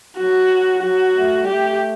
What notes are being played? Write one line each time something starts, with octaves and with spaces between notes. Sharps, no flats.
F#3 F#4
F#3 F#4
A3
G3
A3 G4